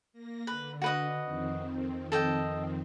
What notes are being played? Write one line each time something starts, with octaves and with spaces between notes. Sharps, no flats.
A#3 A#6
D3 B4
F#4 B4 D#5
F2 D#3 C4
A4 D#5 G5